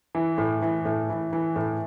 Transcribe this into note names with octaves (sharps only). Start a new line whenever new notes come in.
E3
A2
E3
A2
E3
E3
A2